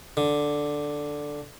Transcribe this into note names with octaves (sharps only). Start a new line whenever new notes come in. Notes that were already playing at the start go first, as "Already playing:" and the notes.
D3